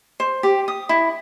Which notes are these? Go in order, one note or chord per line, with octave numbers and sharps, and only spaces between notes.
C5
G4
D#6
E4